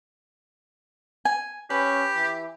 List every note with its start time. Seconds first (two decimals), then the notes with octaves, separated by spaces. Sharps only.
1.25 G#5
1.70 C#4 G4 B4
2.16 E3